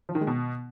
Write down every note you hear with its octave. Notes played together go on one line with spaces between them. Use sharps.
F3
D#3
G#3
B2